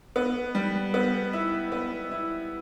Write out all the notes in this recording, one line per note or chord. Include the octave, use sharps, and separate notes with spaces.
B3
G3
B3
E4
B3
E4